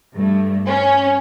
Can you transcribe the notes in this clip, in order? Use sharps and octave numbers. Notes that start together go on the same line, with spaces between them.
G2 A3
C#4